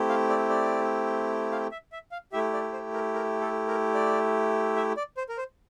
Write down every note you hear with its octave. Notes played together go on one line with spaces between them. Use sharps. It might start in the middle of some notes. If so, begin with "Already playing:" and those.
Already playing: A3 C4 E4 G4
F5
D5
D5
F5
E5
E5
F5
A3 E4 G4 E5
D5
C5
A#4
A#4
A4
A#4
D5
E5
D5
C5
A#4
C5